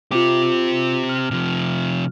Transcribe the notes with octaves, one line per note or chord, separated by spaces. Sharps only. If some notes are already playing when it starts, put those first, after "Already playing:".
C4 F4 G4 D6
F6
C3 F3